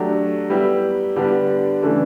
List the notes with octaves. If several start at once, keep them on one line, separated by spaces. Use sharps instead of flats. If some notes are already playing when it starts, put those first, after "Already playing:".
Already playing: F#3 A3 D4 G4
G3 B3 E4 G4
D3 G3 B3 D4
C#3 E3 A3 D4